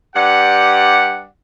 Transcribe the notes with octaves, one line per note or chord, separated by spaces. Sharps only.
G2 G4 D5 F#5